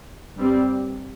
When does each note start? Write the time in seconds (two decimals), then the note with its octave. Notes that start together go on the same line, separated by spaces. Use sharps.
0.36 G2 G3 C4